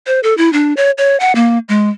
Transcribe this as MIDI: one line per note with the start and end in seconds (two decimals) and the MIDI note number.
0.07 0.20 72
0.23 0.36 69
0.38 0.52 64
0.53 0.73 62
0.77 0.91 73
0.98 1.19 73
1.20 1.32 78
1.35 1.59 58
1.69 1.90 56